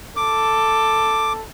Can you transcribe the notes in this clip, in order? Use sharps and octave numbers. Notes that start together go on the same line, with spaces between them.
A4 D6